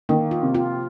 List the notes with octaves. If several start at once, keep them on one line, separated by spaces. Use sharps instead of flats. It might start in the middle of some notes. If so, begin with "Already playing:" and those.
D#3 A#3
F4
C3
F4